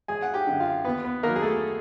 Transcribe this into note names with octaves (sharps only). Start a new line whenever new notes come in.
G#1 G#4 G#5
F#5
G4 G5
F#2 D3
F4 F5
D#2 B3 B4
B3 B4
D#3 F#3 A#3 A#4
G#4
A3 A4